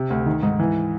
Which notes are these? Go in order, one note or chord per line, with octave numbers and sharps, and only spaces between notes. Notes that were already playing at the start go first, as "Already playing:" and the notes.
Already playing: C3
D2
D#3
G#2
E3